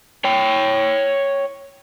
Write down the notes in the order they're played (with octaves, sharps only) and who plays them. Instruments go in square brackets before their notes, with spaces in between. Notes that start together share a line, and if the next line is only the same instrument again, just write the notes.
[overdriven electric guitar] C#5 G5